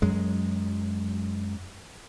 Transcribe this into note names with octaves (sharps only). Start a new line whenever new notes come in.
F#2 F#3 G#3